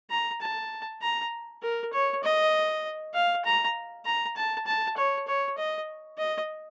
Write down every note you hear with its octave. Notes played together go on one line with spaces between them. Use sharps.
A#5
A5
A#5
A#4
C#5
D#5
F5
A#5
A#5
A5
A5
C#5
C#5
D#5
D#5